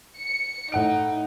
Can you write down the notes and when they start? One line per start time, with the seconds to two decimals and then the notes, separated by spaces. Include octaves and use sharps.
0.18 C#7
0.72 A2 D#4 F#5 D7